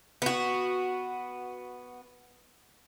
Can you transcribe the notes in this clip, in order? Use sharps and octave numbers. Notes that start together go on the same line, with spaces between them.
B3 F#4